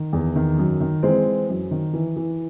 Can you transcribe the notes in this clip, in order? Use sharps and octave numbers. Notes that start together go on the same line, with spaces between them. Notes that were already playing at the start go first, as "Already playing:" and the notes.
Already playing: D#3
E2
D#3
F#2
D#3
E3 G#3 C4
E3
F#2
D#3
E3
E3